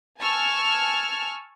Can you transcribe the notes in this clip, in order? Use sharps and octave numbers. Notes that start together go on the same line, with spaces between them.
G#5 A5 C#6 E6 F6 G#6